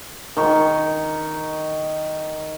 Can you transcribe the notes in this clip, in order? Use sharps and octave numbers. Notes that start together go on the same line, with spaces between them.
D#3 C#6